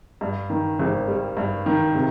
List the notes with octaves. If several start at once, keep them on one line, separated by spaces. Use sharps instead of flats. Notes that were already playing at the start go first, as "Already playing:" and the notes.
G2
D#3
G#1
G3
G2
D#3
C3